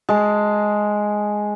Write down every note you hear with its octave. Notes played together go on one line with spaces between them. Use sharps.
G#3 A5